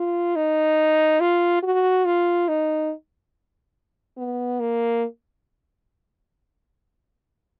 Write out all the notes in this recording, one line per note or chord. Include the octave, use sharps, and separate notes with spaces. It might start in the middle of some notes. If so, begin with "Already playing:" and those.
Already playing: F4
D#4
F4
F#4
F4
D#4
B3
A#3